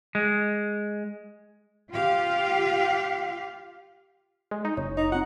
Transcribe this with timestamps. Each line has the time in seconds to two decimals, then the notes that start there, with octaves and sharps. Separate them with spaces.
0.15 G#3
1.92 F4 G4 F5
4.51 G#3
4.65 D#4
4.77 F#1 C#5
4.97 D#4 A#5
5.12 C4 D#4 F4 F#5